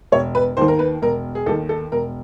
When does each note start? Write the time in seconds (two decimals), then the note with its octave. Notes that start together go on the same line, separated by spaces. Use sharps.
0.12 E1 C#5
0.35 B4
0.57 D#2 D#3 C5
0.68 A#4
0.79 B4
1.02 E1 A#4
1.35 G#4
1.46 D#2 A4
1.49 D#3
1.69 A4
1.92 E1 A#4